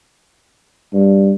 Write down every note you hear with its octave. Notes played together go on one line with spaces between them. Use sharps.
G2